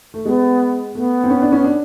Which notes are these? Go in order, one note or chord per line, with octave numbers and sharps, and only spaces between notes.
A3
G#3 B3
A3 B3
C4
C#4
D4
C#4
D4